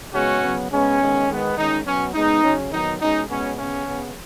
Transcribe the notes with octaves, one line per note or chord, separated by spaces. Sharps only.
C#3 G#3 B3 C#4 F#4
C#3 F#3 B3
C#3 G#3 B3 C#4
D#3 G#3 B3
D#3 G#3 B3
D#3 G#3 C#4 D#4
B2 F#3 B3 C#4
C#3 G#3 B3 D#4
C#3 F#3 C#4
D#3 F#3 B3 D#4
B2 G#3 C#4 D#4
B2 G#3 B3 C#4
C#3 B3 C#4
C#3 B3